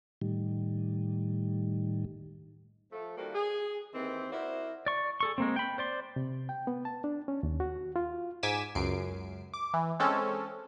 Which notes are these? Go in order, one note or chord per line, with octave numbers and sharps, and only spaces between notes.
A2 D#3 G3
F3 A3
D#3 F3 G3 A#3 F#4 A4
G#4
D#2 D#3 E3 C4
E4 F#4 A#4 C5 D5 E5
D5 C#6
G#4 A4 C#6
G#3 A#3 C4
G5 B5
C5 D5 C6
C3
G5
B3
A5
D4
C#4
D#2
F#4
F4
G#2 G#5 D6 B6 E7
C#2 F#2 C7 D7
D6
E3
G#3 C4 C#4 A4